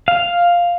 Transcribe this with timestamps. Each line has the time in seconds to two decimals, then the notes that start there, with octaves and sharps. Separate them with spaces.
0.08 F5